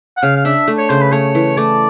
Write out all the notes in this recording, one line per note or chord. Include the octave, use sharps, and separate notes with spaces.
F#5
C#3 F5
F5
D4 E5
A3
C#5
C#3 C5
B4
A3 C#5
E3
A3 D5